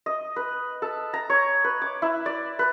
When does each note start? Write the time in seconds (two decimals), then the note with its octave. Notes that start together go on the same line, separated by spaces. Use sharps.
0.06 D#5
0.36 B4
0.82 A4
1.14 A#5
1.30 C#5
1.64 B4
1.82 D6
2.02 E4
2.26 D5
2.59 B4